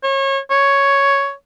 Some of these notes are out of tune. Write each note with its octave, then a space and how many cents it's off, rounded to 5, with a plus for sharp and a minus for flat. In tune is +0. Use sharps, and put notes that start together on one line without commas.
C#5 -30
C#5 +5